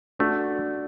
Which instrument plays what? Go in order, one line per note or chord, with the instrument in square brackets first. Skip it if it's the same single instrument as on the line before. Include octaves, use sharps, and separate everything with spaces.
[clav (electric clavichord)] A3 [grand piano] D4 F#4